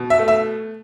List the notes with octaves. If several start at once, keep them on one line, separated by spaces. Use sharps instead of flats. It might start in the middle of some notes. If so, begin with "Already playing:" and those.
Already playing: B2
E5
A3
E5